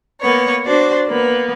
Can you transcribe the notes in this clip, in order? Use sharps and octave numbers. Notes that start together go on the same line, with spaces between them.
A#3 B3 C#5
D4 F#4 C5 D5
A#3 B3 B4